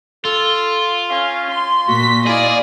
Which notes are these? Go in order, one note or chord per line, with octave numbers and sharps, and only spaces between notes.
F4 A4
C#4 F5
C6
A#2 F#4 B6
E4 G#4 D5 D#5 F5